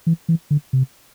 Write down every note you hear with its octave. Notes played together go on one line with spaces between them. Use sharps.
E3
E3
D3
C3